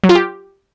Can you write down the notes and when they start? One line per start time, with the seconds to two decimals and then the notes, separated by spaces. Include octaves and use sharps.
0.04 F#3
0.09 F4
0.15 G4